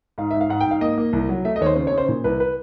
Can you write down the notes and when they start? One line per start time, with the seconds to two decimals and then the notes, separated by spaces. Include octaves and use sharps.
0.18 G#2 F5
0.31 G#2 E5
0.41 F5
0.50 G#2 F#5
0.60 G5
0.66 G#2
0.71 F5
0.81 A#3 D#5
0.98 A#3
1.13 C2
1.29 F#3
1.45 A3 E5
1.56 D#5
1.61 D#2 C#5
1.66 C5
1.76 C#3 C5
1.87 C#5
1.92 C#3
1.98 C5
2.08 A#2
2.24 C2 B4
2.40 B4